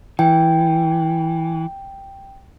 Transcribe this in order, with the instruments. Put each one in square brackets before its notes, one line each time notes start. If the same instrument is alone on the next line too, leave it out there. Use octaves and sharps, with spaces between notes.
[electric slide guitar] E3 [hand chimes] G5